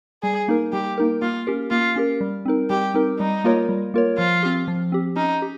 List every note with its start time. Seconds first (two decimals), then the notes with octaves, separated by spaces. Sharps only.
0.23 G3 G#4
0.48 A#3 D#4 A#4
0.72 G3 G4
0.98 A#3 D#4 A#4
1.22 A#3 F4
1.47 C#4 G4 A#4
1.71 A#3 F4
1.96 C#4 G4 A#4
2.21 G3
2.46 C4 D#4 A#4
2.70 G3 G4
2.94 C4 D#4 A#4
3.19 G3 D#4
3.44 A#3 F4 A#4 C#5
3.69 G3
3.94 A#3 F4 A#4 C#5
4.18 F3 F4
4.43 C4 G4
4.68 F3
4.92 C4 G4
5.16 C#4 D#4
5.42 G4